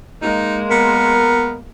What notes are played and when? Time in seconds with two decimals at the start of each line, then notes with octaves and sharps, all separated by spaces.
0.22 G#3 A#3 D#4
0.70 B3 A#4